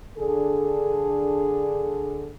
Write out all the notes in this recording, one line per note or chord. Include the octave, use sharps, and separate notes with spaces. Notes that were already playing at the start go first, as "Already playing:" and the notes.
D3 D4 G#4 A4